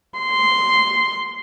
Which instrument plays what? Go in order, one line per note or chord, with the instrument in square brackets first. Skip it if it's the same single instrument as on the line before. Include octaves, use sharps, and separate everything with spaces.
[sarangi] C6